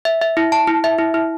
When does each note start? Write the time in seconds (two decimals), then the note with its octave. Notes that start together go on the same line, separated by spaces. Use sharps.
0.05 E5
0.21 E5
0.37 E4
0.52 A5
0.67 E4
0.84 E5
0.98 E4
1.14 E4